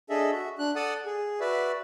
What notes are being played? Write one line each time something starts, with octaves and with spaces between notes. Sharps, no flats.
D4 G#4 A4 D#5 E5
F#4 E5
D4 F#6
A4 D5 F#5 A5 D#6
G#4
F#4 B4 D5 E5